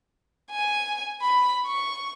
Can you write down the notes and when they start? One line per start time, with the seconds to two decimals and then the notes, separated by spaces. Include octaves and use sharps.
0.51 G#5
1.22 B5
1.66 C#6